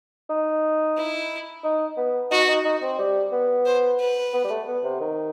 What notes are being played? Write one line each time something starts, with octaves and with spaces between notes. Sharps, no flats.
D#4
E4
D#4
B3
D#4 F#4
D#4
D#4
C4
G3
B3
C5
B4
B3
G3
A3
B3
C3
D#3